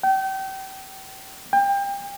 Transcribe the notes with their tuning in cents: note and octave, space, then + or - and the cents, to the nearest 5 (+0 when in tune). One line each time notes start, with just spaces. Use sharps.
G5 -30
G5 +30